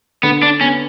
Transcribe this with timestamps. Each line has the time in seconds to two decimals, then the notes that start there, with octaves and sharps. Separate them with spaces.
0.23 D3 B3
0.43 D4
0.61 B3 C#4